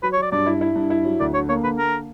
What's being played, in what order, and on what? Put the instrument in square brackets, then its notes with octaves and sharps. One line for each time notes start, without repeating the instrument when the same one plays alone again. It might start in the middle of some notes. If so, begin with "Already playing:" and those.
[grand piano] F#3 [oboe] B4
[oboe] C#5
[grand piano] F#3 [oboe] D5
[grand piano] G2 [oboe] D5
[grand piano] E4
E4
G2
E4
F#3
[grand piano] D2 [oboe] D5
[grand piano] D3 [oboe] C#5
[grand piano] A#3 [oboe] C#5
[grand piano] D3 [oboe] B4
[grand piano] A#3 [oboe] A#4